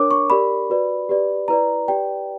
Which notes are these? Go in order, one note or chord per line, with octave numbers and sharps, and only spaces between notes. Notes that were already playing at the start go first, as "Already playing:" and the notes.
Already playing: D4 A#4 C#5 D6
C#6
G4 A#4 D5 B5
F#4 B4 D5
G4 B4 D5
E4 B4 D5 A#5
G4 B4 D5 G5